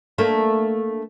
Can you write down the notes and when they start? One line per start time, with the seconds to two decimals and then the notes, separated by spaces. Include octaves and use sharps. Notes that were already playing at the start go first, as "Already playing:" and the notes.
0.18 A3 A#3 D4